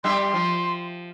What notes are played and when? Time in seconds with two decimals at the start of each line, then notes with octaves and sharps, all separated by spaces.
0.04 G3 G4 E5 C6
0.34 F3